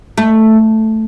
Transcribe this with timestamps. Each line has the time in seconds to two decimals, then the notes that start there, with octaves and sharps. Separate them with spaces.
0.18 A3